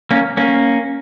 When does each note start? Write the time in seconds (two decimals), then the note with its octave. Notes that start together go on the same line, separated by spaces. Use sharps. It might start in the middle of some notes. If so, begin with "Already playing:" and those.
0.11 A#3 C#4
0.37 A#3 C#4